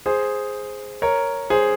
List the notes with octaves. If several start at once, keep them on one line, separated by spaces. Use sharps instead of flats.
G#4 C5
A#4 C#5
G#4 C5